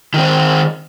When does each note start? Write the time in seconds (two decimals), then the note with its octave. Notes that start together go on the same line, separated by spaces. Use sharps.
0.14 D#3 C4